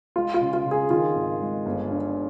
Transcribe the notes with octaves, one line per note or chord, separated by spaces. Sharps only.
G#3 F4
F4
C#3
F4
C#3
G#4
D#3 F4
G#1
G#3
G1
G2